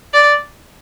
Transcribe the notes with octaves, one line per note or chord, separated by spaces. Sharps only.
D5